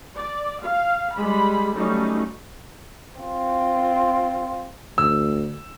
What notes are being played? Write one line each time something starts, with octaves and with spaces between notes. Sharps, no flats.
D5
F5
G3 G#3 B5
F#3 G3 A3 C#4 D#4
C4 F4
D2 E6